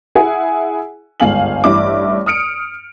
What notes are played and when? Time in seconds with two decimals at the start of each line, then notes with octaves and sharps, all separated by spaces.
0.15 E4 G#4 F#5 G#5
1.20 G1 C#2 G#2 F5 G#5 F#7
1.64 A1 G2 E4 D6
2.26 D#6 F6 C#7 D7